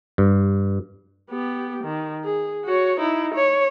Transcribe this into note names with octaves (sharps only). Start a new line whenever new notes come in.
G2
B3 G4
D#3
G#4
F#4 C#5
D#4 E4
C#5